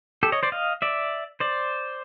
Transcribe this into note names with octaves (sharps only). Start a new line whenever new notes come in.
G4 A4
C#5 D#5
C5 D5
D#5 F5
D5 E5
C5 D5